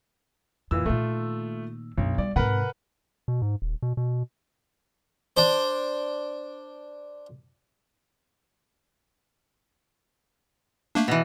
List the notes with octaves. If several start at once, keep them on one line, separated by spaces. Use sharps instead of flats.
F2 A#2 E3 E6
A#2 D#3 A3 F4
B1 F#2 D4
G3 D5
G#2 C3 A#4 B4 F#5
B2
G#2
D#1
B2
B2
D4 C5
A3 A#3 D4
B2 E3